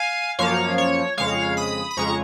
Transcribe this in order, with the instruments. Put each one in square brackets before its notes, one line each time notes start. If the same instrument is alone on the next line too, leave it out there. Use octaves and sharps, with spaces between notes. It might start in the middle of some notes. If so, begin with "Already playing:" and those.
Already playing: [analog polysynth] F5 G#5
F#2 F3 A#3 C#5 F5
C#5
F2 C#3 G#3 C#5 F5
B5 D#6
B5
F2 C#3 G#3 A#5 C#6